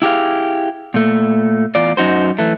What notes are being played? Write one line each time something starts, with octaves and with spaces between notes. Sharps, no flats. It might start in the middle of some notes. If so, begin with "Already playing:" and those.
E4 G4 G#4 F5
A#2 A3
E2 F4 D5
F#2 D#4 F#4 C5
E3 A3